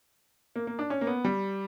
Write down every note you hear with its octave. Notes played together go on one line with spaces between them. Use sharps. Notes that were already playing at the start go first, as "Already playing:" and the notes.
A#3
A#3
D4
C#4
A#3
B3
G3